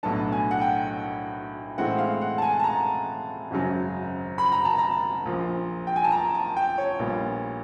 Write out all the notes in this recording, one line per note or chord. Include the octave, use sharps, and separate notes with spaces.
B1 A2 F#3 B3 D4 A5
G#5
F#5
G5
A2 E3 G#3 C4 F#5
F5
F#5
A5
G#5
A5
A#5
G#1 F#2 C#3 F#3
B5
A#5
A5
A#5
A#1 A#2 F3
G5
G#5
A5
A#5
A5
G5
C#5
A#1 A#2 G3 B3